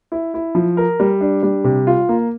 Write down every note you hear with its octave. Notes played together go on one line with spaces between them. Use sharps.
E4
E4
F3
A#4
G3
D4
G3
C3
F4
A#3